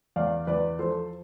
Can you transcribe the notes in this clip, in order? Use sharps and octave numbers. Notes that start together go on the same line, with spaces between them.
E2 D5 F5
E2 B4 D5
F3 A4 C5